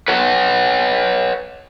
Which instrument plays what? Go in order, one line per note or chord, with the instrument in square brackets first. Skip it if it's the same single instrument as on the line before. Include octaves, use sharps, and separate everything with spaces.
[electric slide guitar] B4 C#5 F#5